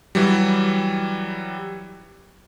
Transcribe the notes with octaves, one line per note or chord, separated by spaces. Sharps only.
E3 F#3 G3